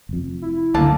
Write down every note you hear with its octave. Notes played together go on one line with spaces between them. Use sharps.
F1 F2
E4
C#2 F#2 D3 A#3 D4 F4 A5